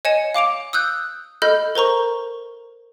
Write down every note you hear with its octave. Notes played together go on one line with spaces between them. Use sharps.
C#5 D#5 G#5 C#7 E7
F5 D6 D7 F7
D#6 E6 F#6 G6
A4 D#5 B5 F6 G6
A#4 C5 A#5 C#6